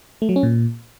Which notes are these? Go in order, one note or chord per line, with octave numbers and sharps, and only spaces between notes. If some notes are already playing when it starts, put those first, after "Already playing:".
A3
F#3
C#4
A#2